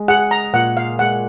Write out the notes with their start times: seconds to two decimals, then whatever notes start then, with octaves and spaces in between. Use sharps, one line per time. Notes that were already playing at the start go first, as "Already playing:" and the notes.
Already playing: G#3
0.08 G#4 F#5
0.31 A#5
0.53 A#2 F#5
0.77 F5
0.99 G#3 F#5